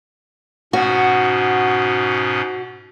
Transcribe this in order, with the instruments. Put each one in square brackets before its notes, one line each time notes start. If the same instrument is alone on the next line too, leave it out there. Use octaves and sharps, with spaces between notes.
[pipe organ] G#2 B2 C#4 [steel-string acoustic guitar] F#4